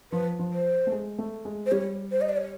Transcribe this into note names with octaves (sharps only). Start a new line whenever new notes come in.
F3 B4
F3
C5
A3
G#3
A3
G#3
C5
G3 C#5
C5
D#5
D5
C#5